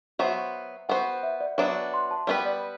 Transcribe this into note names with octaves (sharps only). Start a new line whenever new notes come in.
F#3 B3 F#4 C5 E5
B3 F#4 C5 F#5
E5
D5
F#3 B3 D4 F#4 E5
C6
A5
G3 B3 F#4 B4
D5